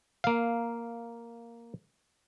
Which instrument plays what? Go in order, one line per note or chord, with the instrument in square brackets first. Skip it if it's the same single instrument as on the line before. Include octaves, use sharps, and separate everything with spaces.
[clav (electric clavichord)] A#3 F5